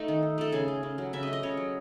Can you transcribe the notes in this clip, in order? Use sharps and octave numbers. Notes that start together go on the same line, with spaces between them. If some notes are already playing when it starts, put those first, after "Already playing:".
Already playing: A3 D#4
D#3
D#3
A3 A4
C#3 G#4
A3
C#3
F#3
C#3 E5
D#5
A3
D#5
C#3 C#5
F#3